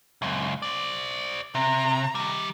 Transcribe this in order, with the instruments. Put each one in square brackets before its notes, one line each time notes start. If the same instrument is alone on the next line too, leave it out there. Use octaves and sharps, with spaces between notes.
[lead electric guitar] C#2 F#2
C5 D5
[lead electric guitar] C3 [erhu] A#5
[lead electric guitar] D#3 G3